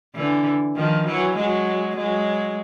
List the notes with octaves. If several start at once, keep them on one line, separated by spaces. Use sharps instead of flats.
D3 E3
D#3 F3
E3 F#3
F#3 G#3
F#3 G#3